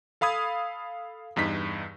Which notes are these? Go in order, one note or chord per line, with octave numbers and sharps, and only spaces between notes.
A4 F5 B5 D#6 G#6
E2 G2 D#4 B6